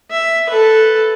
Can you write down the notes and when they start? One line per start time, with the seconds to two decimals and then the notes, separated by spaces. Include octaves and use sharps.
0.11 E5
0.50 A4 B4